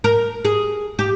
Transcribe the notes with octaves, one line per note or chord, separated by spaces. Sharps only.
A#4
G#4
G4